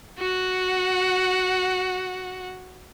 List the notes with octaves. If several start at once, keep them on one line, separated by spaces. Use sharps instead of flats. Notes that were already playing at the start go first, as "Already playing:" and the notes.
F#4 F#5